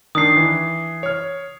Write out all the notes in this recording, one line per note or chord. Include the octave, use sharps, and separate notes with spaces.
D#3 D4 D#6 C7
E3
C#5 F6